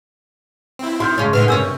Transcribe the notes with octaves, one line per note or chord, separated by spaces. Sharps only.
C4 E4
D#3 F#4 C6 F6 G6
G2 C#3 G#3 C#4 C6
A2 D3 D#3 B4 E5 F6
G2 C3 C#4 D4 A#4 E6